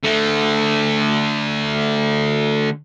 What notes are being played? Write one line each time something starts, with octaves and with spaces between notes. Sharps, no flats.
D3 A3